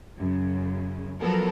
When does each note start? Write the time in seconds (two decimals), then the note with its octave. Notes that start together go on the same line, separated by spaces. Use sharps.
0.16 F#2 C#3
1.19 F3 F#3 B3 A4 A#4